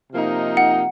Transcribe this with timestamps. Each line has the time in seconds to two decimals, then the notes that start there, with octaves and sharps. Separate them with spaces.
0.12 C3 F3 A#3 D#4
0.57 F#5